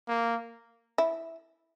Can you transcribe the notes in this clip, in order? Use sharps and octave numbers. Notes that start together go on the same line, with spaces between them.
A#3
E4